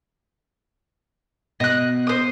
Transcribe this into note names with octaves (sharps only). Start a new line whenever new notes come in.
B2 D#5 F#6
C5 D#6